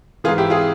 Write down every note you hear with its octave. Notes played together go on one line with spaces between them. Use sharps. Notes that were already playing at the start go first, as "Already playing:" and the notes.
G#2 E3 F4 G#4
E4 G4
F4 G#4